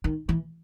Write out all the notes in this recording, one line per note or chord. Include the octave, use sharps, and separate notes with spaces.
D#3
E3